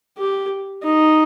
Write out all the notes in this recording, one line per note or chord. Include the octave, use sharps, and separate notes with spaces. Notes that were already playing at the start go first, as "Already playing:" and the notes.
G4
D#4